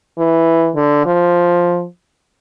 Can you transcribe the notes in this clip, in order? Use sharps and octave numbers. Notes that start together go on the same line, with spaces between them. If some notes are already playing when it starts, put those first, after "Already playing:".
E3
D3
F3